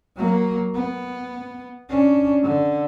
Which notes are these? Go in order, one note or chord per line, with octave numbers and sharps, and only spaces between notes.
F#3 A#3
B3
C#4 D4
D3